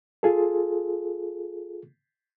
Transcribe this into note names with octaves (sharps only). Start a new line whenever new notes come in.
F4 G#4 A4